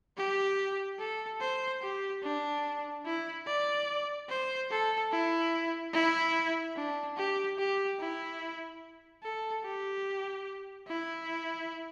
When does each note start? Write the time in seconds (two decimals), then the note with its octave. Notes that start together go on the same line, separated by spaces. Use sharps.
0.17 G4
0.99 A4
1.41 C5
1.82 G4
2.23 D4
3.05 E4
3.47 D5
4.29 C5
4.70 A4
5.12 E4
5.94 E4
6.76 D4
7.17 G4
7.58 G4
7.99 E4
9.23 A4
9.64 G4
10.88 E4